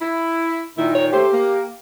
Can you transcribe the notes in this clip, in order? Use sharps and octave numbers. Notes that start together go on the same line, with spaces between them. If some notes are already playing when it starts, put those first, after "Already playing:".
E4
A#2 D#3 E4
C#5
A3 G4 C5
A#3